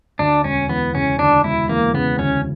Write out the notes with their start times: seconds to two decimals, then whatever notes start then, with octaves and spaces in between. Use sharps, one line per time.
0.19 D2 D4
0.44 E1 C#4
0.69 E3 B3
0.95 C#3 C#4
1.19 D2 D4
1.44 E1 E4
1.69 E3 A#3
1.94 C#3 B3
2.19 D2 C#4